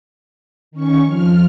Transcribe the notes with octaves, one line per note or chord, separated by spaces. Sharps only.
D#3 C#4 C#6
F2 F3 F6